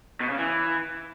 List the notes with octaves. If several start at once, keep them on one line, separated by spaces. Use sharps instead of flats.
B2
C#3
E3